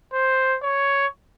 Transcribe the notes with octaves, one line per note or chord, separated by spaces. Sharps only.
C5
C#5